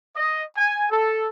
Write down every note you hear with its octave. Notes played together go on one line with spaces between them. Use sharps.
D#5
G#5
A4